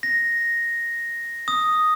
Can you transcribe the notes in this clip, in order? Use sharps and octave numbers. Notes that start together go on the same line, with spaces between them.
A#6
D#6